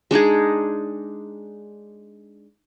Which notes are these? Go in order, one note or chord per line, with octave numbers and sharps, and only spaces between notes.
G#3 D4 D#4 G#4